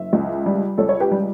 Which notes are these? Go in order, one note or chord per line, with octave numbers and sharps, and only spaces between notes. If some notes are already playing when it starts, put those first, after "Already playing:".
Already playing: F#1 E5
C#2
G3
C#2 A4 C#5
C#5
G4 B4
G3